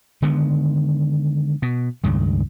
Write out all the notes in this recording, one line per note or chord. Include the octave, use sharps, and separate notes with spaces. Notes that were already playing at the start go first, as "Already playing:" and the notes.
D3 D#3 G#3 B3
B2
C#2 G2 D#3